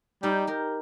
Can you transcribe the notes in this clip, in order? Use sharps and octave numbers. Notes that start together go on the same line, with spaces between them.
G3 D#4 G4
G4 A#4